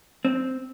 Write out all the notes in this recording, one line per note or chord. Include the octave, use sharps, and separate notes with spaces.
C4